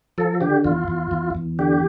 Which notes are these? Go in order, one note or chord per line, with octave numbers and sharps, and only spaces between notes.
F3 A4
D3 G4
E2 F4
E2
E2
E2
D3 G4